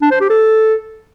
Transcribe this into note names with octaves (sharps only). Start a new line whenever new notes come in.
D4
C5
G4
A4